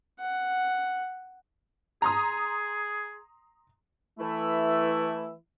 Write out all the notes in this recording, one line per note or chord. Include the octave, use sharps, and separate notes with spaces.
F#5
G#4 A#5 C6 D#6
E3 A3 E4